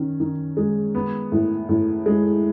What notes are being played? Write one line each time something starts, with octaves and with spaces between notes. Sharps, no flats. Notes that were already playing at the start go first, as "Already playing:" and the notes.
Already playing: D#3 C#4
D#3
G#3
B3
A2
A2
G#3